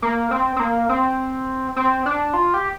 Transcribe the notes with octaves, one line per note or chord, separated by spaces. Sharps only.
A#3
C4
C4
A#3
C4
C4
D4
F4
G4